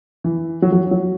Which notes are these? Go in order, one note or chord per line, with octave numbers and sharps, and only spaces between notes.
E3
F#3
F#3
F#3